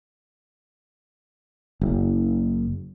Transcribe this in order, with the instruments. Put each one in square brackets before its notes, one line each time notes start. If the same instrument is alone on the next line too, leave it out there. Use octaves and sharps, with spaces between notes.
[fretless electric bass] F#1